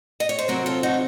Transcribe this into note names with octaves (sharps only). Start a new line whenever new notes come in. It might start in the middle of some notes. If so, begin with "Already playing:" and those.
D#5
C#5
C5
C3 F#3 C4 F#4 A#4
F4 A4
D#4 F#4